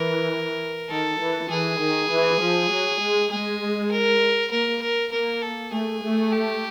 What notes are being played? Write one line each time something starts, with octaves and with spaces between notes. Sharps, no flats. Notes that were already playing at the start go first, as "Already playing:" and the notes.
Already playing: E3 A#4
D#3 A4
E3
E3 G#4
D#3
E3
F3
F#3
G#3
G#3 G#4
A#4
A#3 A#4
A#4
A#3 A#4
A4
A3 G#4
A3
G4